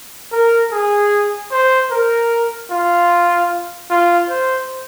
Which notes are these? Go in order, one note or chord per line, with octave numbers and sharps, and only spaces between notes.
A#4
G#4
C5
A#4
F4
F4
C5